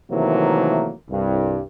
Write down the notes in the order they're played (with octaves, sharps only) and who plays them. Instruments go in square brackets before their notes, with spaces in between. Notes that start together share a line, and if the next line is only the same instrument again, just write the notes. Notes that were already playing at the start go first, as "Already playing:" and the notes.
[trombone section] C3 D#3 E3 F#3 A3 A#3
C2 G2